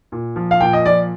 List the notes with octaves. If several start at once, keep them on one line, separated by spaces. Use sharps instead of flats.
A#2
F3
F5
A#2 G5
D#5
F3 D5